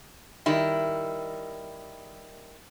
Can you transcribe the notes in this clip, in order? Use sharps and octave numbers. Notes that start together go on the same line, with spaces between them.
D#3 G3 E4